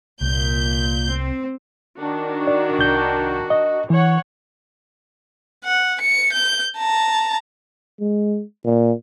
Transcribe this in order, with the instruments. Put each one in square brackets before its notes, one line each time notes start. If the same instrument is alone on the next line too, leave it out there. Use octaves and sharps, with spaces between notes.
[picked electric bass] C2 [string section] A#2 G6
[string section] C4
[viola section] D#3 D4 F#4
[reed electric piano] D5
C2 G6
D#5
[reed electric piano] E3 [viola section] C#5 F#5
[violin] F#5
C#7
G6
A5 A#5
[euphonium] G#3
A#2